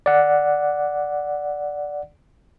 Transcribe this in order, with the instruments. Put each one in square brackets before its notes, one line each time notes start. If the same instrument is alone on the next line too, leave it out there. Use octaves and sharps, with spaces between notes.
[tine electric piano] D5 F#5